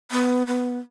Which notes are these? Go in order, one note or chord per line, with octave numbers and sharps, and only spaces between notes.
B3
B3